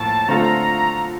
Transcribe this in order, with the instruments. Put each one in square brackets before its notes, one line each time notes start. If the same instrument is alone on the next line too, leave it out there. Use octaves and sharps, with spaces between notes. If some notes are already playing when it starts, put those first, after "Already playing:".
Already playing: [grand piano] A2 F3 A#3 A4 [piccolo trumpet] A5
[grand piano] D3 A3 C4 F4 A4 [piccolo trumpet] A#5